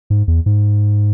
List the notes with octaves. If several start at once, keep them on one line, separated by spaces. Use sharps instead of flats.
G#2
E2
G#2